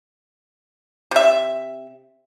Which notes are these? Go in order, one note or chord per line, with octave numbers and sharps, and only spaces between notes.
C3 E5